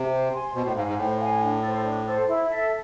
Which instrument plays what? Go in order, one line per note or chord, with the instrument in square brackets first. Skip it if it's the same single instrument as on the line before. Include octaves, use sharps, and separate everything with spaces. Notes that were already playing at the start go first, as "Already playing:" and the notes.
Already playing: [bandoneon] C3
[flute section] C5
G#5 C6
[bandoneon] B2 [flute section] C5
[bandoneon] A2
[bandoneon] G#2 [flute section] F5
[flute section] G#5
[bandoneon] G#2
[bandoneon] A2 [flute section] C5
[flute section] F5 G#5
D4
A4
C5
D4
A4 C5
E4
A4 E5